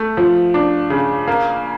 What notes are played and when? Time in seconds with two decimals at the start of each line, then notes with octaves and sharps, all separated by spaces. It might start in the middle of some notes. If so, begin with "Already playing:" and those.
Already playing: A3
0.17 F3
0.54 D4
0.90 C#3
1.28 A#3